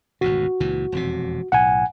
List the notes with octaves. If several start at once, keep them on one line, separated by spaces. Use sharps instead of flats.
G#1 D2 B2 F#4
C#2 A#2 E3
E1 F2 C3
B1 A2 F#5 G#5